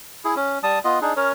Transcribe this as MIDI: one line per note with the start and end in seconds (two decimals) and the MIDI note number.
0.25 0.35 64
0.25 0.35 68
0.36 0.59 61
0.63 0.79 55
0.63 0.79 81
0.63 0.79 87
0.84 0.99 59
0.84 0.99 65
0.84 0.99 75
1.02 1.13 62
1.02 1.13 63
1.02 1.13 68
1.17 1.32 61
1.17 1.32 70
1.17 1.32 73